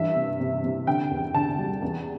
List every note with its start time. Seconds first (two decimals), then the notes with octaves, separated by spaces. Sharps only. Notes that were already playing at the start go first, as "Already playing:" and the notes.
Already playing: G2 E3 E5
0.16 C3
0.40 C3
0.64 C3
0.87 D3 G5
1.11 E2
1.34 D3 A5
1.59 G3
1.82 E2